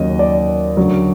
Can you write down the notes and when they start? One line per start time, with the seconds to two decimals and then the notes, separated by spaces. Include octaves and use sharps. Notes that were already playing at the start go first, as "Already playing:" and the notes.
Already playing: D#2 C#3 F#3 D#5
0.19 D5
0.77 D2 C#3 F#3